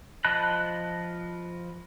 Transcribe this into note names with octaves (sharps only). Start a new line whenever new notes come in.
F3 D#5 A5 B5 F#6